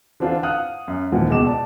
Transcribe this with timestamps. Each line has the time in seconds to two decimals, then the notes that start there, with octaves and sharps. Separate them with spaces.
0.20 D3 E3 C4 D4 F4
0.43 F5 F#5 D#6 F6 F#6
0.88 F#2
1.12 D#2 A#2 E3 F3 F#5
1.30 C#2 B2 D6 E7
1.46 D5 A5